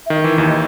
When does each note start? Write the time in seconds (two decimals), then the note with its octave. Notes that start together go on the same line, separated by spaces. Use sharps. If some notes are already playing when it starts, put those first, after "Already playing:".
0.06 E5
0.10 D#3 D#5
0.24 E3
0.38 D#2 D#3